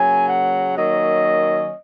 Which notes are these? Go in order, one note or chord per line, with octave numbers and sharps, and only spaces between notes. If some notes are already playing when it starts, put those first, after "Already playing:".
Already playing: C#3 F#3 A#3 G#5
F#5
D#3 F#3 A#3 C#4 D#5